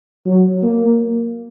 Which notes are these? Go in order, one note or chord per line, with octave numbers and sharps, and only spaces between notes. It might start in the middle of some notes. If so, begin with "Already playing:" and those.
F#3
A#3